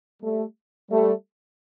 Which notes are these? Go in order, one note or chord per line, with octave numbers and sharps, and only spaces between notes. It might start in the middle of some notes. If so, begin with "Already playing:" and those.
G3 A3
G3 A3